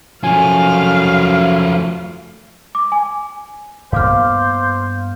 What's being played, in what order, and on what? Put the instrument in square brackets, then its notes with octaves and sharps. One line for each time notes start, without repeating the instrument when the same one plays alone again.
[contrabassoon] F#2 [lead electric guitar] F3 A3 [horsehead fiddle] F5 [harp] G#5
[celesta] D6
G#5
[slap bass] G2 A#3 B3 [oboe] C5 [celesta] F5 D6 F6